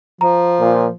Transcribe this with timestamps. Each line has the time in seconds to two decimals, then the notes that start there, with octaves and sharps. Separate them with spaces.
0.21 F3 A#5
0.60 A#2